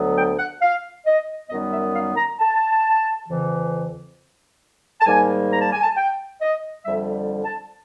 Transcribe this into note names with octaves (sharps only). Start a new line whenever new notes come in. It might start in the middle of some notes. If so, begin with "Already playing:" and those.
Already playing: D2 D3 F#3 B3
G5
F#5
F5
D#5
F#2 D#3 G3 B3 D#5
E5
F5
A#5
A5
F2 C#3 E3
A5
G#2 D#3 G3 A#3 G#5
A#5
A5
G#5
A5
G5
D#5
F2 D3 G3 E5
A5